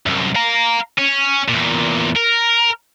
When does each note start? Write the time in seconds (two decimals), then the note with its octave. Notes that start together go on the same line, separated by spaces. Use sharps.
0.06 C2 F#2
0.35 F5 A#5
0.99 C#4
1.48 E2 A#2
2.16 A#4